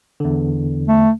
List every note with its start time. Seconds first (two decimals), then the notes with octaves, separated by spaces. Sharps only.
0.20 E2 D3
0.88 A3